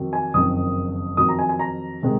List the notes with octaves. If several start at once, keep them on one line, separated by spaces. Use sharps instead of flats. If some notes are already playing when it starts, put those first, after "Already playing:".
Already playing: F2 D#3 F#3
G#5
F#1 F2 D#3 D#6
F2 D#3 F#3 D#6
A#5
G#5
G#5
A#5
C3 D#3 G#3